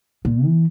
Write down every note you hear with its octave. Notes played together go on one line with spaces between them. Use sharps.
A#2
E3